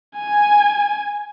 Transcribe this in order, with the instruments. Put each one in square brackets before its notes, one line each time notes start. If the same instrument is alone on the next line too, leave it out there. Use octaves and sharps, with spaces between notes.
[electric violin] G#5